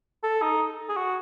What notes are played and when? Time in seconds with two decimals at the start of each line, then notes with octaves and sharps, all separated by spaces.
0.23 A4
0.42 D#4
0.89 G#4
0.97 F#4